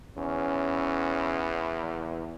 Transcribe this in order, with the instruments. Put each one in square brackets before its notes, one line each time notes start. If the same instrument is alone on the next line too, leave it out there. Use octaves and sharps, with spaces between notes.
[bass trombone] E2 [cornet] C#4